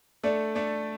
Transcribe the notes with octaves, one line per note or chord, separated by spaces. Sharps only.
A3 D4 A4 D5
A3 D4 A4 D5